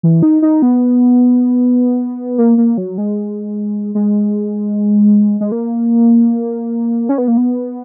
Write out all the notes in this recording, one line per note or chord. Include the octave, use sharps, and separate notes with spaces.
E3
D#4
D#4
B3
A#3
A#3
F#3
G#3
G#3
G#3
A#3
C#4
B3
A#3
B3